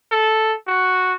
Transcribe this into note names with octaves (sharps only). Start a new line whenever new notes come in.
A4
F#4